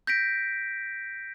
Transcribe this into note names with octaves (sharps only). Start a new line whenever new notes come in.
G6 A#6 B6 D7